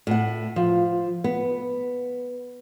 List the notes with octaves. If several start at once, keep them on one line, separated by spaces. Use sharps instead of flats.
A2 F#5
F3
B3